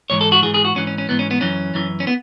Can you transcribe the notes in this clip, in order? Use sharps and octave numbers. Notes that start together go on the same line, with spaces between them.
G#2 E3 C#5
A4
F#4
G#2 E3 G#4
G#4
F#4
G#2 E3 C#4
C#4
C#4
G#2 E3 B3
C#4
B3
F#2 E3 C#4
F#2 E3
C#4
B3